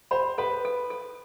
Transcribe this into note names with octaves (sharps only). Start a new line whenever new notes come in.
C5 B5
A4 B4
A4
A4